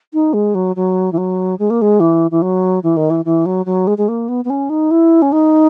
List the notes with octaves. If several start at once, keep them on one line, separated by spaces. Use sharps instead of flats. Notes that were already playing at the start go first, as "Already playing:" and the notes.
D#4
G#3
F#3
F#3
E3
F#3
G#3
A#3
G#3
E3
E3
F#3
E3
D#3
E3
E3
F#3
F#3
G#3
G#3
A#3
B3
B3
C#4
D#4
E4
C#4
D#4